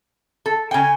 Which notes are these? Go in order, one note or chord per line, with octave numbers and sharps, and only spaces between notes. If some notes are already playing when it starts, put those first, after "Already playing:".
A4
C#3 G5 G#5